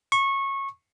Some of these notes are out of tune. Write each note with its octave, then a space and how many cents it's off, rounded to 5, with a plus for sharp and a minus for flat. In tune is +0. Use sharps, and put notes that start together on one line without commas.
C#6 -20